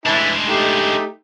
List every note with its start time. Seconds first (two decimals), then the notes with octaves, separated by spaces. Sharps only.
0.06 E3 G#3 D4 E4 A5
0.48 A3 D#4 G4